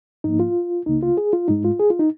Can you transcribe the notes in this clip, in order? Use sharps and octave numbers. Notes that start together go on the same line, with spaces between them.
G#2 F3 A#3 D#4
F4
C#2 C#3 A#3 D#4
F4
G#4
F4
G#2 G#3 D#4
F4
G#4
F4
D#4